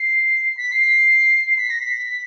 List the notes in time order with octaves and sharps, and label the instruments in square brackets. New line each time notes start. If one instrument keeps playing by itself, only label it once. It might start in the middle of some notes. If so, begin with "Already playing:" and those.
Already playing: [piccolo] C7
B6
C7
C7
B6
A#6
B6